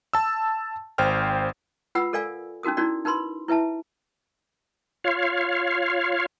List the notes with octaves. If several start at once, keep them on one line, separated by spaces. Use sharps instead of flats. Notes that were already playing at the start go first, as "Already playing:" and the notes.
A5 E6
G#1 C5 G5 F6
F4 B4 F#5 B5 E6
A4 A#4 D5 F5 G#5
C#4 D#4 F#4 A#4 D#6
C#4 D#4 E4 F#4 A#4 D5
D#4 A#4 B4 B5 C6
E4 B4 E5 A5
F4 C#5 F5